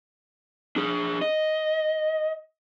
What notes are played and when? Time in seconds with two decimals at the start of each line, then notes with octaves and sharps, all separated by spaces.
0.76 D4 G#4
1.22 D#5